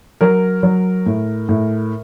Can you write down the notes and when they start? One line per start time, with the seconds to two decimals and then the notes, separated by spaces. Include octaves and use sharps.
0.21 F#3 A#4
0.63 F#3
1.06 A2
1.49 A2